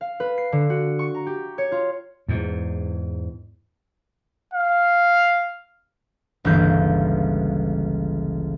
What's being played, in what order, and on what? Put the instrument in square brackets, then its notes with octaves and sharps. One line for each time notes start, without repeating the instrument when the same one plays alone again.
[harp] F5
B4
C7
D3
F#4
C#6
A#5
G4
C#5
F4
[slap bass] E2 G#2
[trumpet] F5
[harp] G1 C#2 E3 A#3 F5 G6